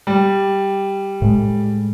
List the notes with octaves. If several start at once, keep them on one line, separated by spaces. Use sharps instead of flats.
G3
A2 G#3